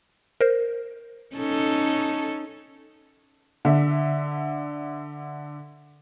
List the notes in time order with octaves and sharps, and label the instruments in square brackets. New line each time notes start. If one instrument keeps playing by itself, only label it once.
[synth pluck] A#4 C5
[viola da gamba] C#4 D#4 A4
[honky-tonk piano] D3 E5